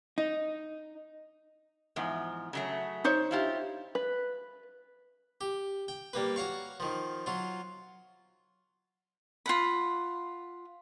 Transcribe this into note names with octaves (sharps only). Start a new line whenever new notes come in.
D#4
E2 G#2 F3
C#3 F#3 A3
D#4 C5 C#5
E4 F4 G4
B4
G4
G5
G3 A#3 B4
F#4 C#5 F5 C#6
D#3 F3
F#3 F4
F4 F#5 B5